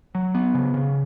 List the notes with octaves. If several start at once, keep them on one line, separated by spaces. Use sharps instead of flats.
F#3
B3
C#3
C#3